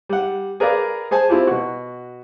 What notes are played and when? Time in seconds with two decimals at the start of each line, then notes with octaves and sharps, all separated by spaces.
0.09 G3 F#5
0.60 G#4 A#4 B4 D5 F5
1.11 G#4 C5 G#5 A5
1.29 C4 E4 F4 G4
1.47 B2 F#4